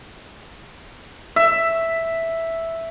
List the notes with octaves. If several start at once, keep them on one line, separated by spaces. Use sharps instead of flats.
E5